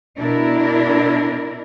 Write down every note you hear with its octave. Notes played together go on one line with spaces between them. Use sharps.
B2 D4 E4 A#4